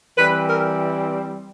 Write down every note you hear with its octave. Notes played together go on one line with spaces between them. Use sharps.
E3 G3 C4 B4
A#4